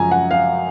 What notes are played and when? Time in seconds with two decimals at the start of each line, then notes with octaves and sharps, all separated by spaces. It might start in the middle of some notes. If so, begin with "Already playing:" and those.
Already playing: F#2 C#3 F3 G#3 G#5 A#5
0.12 F#5
0.31 F5